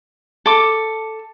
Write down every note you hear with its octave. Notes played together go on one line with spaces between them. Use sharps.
A4 D6